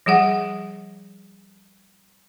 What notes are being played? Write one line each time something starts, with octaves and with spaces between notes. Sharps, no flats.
F3 G3 G#4 F#5